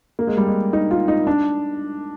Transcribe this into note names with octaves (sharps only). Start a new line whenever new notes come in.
A#3
G#3
G3
G#3
D#4
F4
D#4
D4